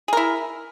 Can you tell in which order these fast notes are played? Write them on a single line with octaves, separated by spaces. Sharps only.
G#4 A#4 E4